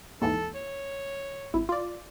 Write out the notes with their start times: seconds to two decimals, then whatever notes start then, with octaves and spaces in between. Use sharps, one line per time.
0.21 D#2 G#2 E3 A4
0.55 C#5
1.54 G#1 E4
1.69 F4 D5